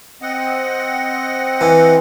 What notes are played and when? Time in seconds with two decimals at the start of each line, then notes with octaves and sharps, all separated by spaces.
0.22 C4 D#5 F#5
1.61 E3